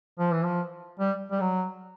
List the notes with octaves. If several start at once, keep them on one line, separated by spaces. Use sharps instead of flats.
F3
E3
F3
G3
G3
F#3